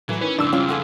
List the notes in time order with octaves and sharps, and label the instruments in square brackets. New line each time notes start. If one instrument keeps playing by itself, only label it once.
[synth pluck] A2 [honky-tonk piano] E3 [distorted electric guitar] F#3 [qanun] E4 E5
[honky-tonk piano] D#3 [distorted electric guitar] C#4 [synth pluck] B4
[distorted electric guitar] F2 C#3 [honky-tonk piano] G#2 E6 [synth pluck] D4 E7
[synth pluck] F3 G3 C#4 [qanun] F4 F5 G5
[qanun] G#4 A4 B4 [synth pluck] F#5 G#5